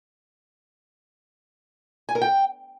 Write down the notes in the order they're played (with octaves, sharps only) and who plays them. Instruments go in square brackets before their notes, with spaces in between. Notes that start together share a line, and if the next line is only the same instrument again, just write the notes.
[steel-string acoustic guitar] G#5
A#4
G5